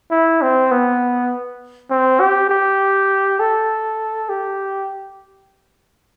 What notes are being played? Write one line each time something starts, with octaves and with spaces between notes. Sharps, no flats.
E4
C4
B3
C4
G4
G4
A4
G4